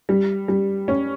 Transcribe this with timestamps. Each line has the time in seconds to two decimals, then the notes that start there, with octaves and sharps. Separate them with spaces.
0.09 G3
0.48 G3
0.88 C#4